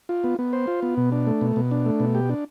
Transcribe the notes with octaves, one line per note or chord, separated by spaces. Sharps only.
F4
B3
B3
C5
F4
B3
B2
D4
A3
B2
B2
D4
A3
B2
G4
D4